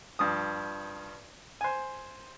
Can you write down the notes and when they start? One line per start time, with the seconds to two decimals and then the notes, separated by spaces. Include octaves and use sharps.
0.19 G2 F3 D#6
1.61 C5 G#5